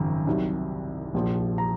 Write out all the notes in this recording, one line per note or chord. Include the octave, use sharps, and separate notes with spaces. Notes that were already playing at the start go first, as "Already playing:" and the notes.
Already playing: G#1 F#2 C#3 F3 A#5
C2 C3 D#3 F#3
A#1 A#2 F3
A#5